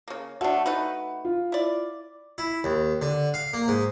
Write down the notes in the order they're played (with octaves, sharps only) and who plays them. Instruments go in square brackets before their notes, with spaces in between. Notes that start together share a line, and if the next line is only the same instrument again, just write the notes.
[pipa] C#3 A#3
[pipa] A3 D4 [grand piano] F#4
[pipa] A3 D#4 B4
[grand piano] F4
[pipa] E4 D5
[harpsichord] E4
D#2
D3
F5
A#3
G#2